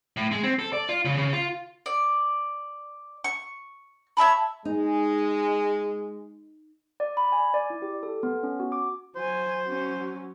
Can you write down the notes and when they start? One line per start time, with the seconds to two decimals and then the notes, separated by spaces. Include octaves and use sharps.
0.17 A2
0.31 G#3
0.43 C4
0.59 A4
0.73 D5
0.89 F4
1.05 C#3
1.18 C#3
1.33 F4
1.86 D5
3.24 C#6
4.17 C#5 E5 A5 B5
4.65 G#3 D#4
7.00 D5
7.17 B5
7.32 G#5
7.54 D5
7.70 E4
7.82 G4
8.03 A4
8.23 B3
8.43 C#4
8.60 F#4
8.72 D6
9.16 F#3 C5 G#5
9.63 F#3 C#4